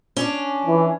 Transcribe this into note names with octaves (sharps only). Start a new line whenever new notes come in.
C#4 D4
E3